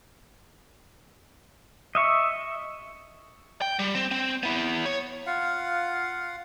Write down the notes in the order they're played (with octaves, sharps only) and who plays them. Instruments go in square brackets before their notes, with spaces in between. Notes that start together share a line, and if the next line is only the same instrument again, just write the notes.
[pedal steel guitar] D#5 E5 C#6
[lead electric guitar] G5
G3
C4
C4
B3 E4
C#5
[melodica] F4 F5 F#5